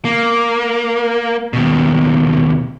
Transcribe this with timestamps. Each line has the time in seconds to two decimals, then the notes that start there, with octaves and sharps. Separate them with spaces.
0.05 A#3
1.53 D#2 B2